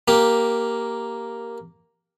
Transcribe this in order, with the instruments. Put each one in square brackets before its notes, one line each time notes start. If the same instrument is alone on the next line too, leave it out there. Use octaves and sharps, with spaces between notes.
[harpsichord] A#3 G4